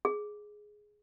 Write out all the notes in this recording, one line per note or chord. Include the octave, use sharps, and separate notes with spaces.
G#4